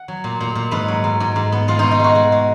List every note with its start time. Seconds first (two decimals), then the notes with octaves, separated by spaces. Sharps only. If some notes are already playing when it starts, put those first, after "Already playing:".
Already playing: F#5
0.08 F#3
0.24 A#2
0.40 A#2
0.55 A#2
0.71 G#2 B4
0.88 F#3
1.04 G#2
1.20 G#2
1.36 G#2
1.52 B3
1.68 G#3 F4
1.79 B2 D#4
1.91 D#4
2.00 G#3 F#4
2.15 G#3
2.32 G#3